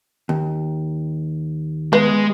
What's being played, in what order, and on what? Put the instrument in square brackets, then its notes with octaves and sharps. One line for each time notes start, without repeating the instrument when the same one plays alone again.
[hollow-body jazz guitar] D#2
[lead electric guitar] G#3 [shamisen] B3